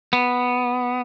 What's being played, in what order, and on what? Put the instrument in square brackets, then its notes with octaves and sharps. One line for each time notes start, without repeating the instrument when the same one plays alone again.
[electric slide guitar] B3